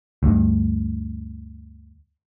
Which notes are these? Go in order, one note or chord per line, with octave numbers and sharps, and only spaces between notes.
D2 G2